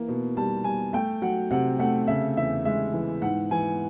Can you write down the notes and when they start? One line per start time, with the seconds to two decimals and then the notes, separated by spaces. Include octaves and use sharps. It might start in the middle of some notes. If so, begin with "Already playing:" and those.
Already playing: E3 A#3
0.08 B2
0.37 G3 A5
0.64 G3 G#5
0.93 A3 G5
1.22 F#3 F#5
1.51 C3 F#5
1.79 A3 F#5
2.07 C#3 E5
2.37 E2 E5
2.65 G#3 E5
2.94 E3
3.22 G#2 F#5
3.51 E3 G#5